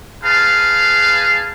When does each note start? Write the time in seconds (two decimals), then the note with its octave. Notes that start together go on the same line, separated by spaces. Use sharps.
0.23 G#4 B4 F5 A5